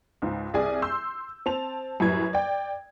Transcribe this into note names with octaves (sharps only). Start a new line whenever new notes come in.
C#2 G#2
C2 G#4 D5 G#5
C6 E6 G6
C4 A5 F7
F#2 A2 G3 B4 G#6
D5 G5